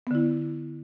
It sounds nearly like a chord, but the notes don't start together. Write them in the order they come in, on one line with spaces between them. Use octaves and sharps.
B3 D3 E4